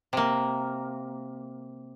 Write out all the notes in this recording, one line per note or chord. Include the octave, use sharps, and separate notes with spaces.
C3 A#3